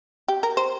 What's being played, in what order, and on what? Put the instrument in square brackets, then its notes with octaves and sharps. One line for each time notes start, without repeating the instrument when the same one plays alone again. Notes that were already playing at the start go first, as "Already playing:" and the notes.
[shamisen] G4
A#4
C5